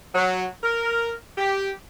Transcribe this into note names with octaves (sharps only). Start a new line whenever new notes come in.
F#3
A#4
G4